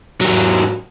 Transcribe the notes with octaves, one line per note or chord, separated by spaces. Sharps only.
G#2 F#3